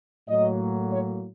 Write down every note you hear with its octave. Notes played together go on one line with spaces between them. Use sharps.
A2 F#3 A#3 D#5
C#5